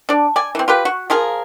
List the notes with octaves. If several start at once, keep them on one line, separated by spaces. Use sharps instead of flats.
D4 D5
D5 G#5
E3 C4
F4 G4 B4
F#4
F3 F4 G#4 A#4